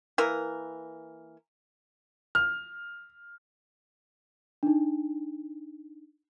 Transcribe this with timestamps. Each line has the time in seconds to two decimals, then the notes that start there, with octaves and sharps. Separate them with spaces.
0.18 E3 A#3 E4 A#4
2.35 F6
4.63 D4 D#4